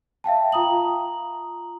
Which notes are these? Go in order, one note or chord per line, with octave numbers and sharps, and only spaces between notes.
E5 F5 G5 A5
F4 A#5 D#6 F#7